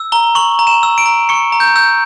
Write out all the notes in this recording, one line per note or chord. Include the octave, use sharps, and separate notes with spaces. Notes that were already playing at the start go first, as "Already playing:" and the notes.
Already playing: E6
A#5 G7
C#6 F#7
A#5
E7
E6
D7
A#5
C#6 C#7
A#5
G6
E6 G6